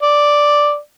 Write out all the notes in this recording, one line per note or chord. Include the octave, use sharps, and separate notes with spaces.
D5